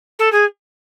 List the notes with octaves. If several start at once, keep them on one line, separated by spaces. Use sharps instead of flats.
A4
G#4